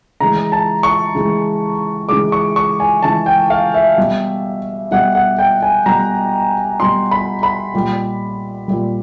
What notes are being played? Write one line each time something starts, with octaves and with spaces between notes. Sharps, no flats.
C#3 E3 G#3 A#5
A5
C#6
C#3 E3 G#3
C#3 E3 G#3 D6
C#6
C#6
G#5
C#3 E3 G#3 A5
G5
F5
E5
B2 G3
B2 G3 F#5
F#5
G5
G#5
B2 G3 A#5
B2 G3 C6
B5
B5
A#2 G3
A#2 G3